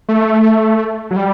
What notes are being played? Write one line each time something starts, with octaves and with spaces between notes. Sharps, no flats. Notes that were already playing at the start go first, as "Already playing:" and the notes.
A3
F#3
G3